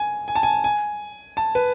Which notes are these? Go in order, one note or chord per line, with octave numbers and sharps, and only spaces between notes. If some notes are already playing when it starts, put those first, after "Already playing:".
Already playing: G#5
G#5
A5
G#5
G#5
A5
B4